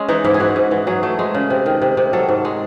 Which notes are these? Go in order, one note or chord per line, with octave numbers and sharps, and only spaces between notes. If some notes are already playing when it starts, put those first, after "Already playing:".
Already playing: G#3 C#4
E3 D#4
G#2 E4
G#4
G#2 F#4
G#2
E3
F#3 G#4
A3
G#3
C#3
C3
D#3
C3
C3
F#3 A4
G#2
G#3